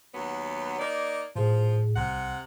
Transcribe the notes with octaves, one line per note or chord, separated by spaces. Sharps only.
D#2 F#3 B3
A#3 D#4 D5
A2 F3 G#4
C2 C3 F#5